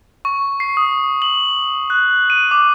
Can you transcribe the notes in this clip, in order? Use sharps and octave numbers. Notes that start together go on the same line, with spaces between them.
C#6
C7
D#6
F#7
F#6
D#7
D6